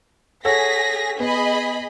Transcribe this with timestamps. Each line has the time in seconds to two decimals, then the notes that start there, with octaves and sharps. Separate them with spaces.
0.45 G#4 A4 C#5 F#5 A#6 B6
1.20 B3 G#4 D#5 B5